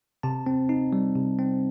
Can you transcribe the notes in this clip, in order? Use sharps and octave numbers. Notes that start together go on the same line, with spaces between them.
C3 A5
C4
D#4
G3
C3
C4